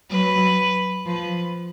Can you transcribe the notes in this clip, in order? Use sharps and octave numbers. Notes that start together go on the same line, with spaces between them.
F#3 B4
F3 B4